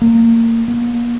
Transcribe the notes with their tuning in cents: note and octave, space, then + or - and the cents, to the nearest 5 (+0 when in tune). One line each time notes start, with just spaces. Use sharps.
A#3 -25
A#3 +40